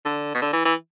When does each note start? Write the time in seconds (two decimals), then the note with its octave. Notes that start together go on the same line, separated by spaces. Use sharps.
0.05 D3
0.35 B2
0.42 D3
0.53 E3
0.65 E3